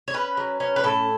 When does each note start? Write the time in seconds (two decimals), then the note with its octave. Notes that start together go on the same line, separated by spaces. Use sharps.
0.08 C#5
0.14 C#4 B4
0.37 F#3
0.60 C#4
0.76 B4
0.83 A2 A4